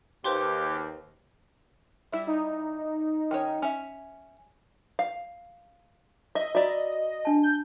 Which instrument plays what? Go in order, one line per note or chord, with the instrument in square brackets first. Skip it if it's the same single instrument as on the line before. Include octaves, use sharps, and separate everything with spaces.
[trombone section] D#2 [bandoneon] G4 [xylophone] B4 C5 C6
[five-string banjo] G3 E4 [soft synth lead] E5
[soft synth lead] D#4
[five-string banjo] D#3 C#4 C#5
C#4 E5
F5
[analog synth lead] D#5 [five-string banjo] E5
[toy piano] F#4 A#5 [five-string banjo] D5 E5
[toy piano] D4 A5
[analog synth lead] G6